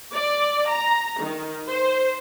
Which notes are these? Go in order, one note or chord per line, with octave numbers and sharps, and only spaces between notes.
D5
A#5
D#3
C5